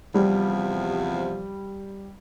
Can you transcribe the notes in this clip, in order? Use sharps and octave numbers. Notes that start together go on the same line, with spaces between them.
E2 C3 F3 G3